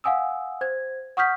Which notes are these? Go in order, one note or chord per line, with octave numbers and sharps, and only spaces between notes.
F5 F#5 G#5 D#6 E6
C5 G#6
F#5 C#6 D#6 F6 G6 B6